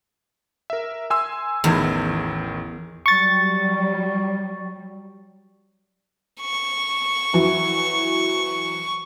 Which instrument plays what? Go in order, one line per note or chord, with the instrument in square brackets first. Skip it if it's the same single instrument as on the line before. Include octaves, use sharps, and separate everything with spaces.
[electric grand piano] A#4 E5
G#5 C6 E6
[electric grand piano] A1 D#3 G#6 [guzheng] E2
[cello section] F#3 G3 [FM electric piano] C#6 A6
[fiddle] C#6
[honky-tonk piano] E3 F#3 E4